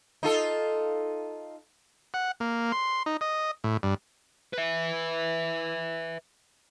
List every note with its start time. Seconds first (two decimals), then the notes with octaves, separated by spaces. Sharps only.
0.23 D#4 F4 A4
2.14 F#5
2.40 A#3
2.72 C6
3.06 D#4
3.21 D#5
3.64 A2
3.83 G2
4.53 B4 E5